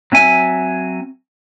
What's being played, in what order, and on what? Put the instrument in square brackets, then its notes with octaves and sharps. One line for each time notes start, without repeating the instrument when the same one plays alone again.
[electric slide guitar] F#3 C4 E5 G#5